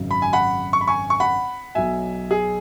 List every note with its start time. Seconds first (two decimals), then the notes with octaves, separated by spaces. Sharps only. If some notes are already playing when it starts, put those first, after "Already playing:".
Already playing: G#1 F#2 C#3
0.11 B5
0.22 G#5
0.33 F#5 B5
0.73 C#6
0.81 B5
0.88 G#5 C#6
1.10 C#6
1.20 F#5 B5
1.75 B1 B2 F#3 E5 G#5
2.31 G#4